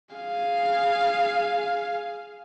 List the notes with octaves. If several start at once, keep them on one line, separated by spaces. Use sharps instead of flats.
G#4 F5